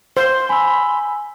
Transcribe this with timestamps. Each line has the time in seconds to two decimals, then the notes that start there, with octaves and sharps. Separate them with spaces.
0.17 C5 C6
0.49 G#5 B5 E6